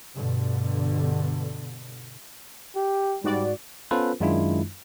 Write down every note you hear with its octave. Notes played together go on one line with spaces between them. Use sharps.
G2 B2 D3
G4
G#2 G3 F#4 D5
B3 C#4 F4 A4 B4 C5
F#2 D#3 G#3 D4 E4 F4